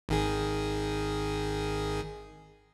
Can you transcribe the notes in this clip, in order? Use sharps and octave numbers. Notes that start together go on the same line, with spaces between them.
G#1 D#3 G#4